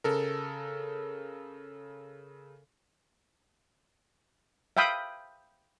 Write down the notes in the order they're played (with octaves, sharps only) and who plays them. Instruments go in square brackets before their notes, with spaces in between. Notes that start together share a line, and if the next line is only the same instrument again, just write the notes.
[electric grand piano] C#3 A4 A#4
[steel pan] E5 F5 G5 B5 D#6